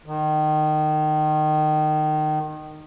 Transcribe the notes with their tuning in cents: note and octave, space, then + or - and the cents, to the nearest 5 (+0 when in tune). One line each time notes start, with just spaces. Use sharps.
D#3 -20